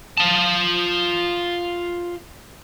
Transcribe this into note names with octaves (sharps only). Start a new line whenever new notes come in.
F4 A5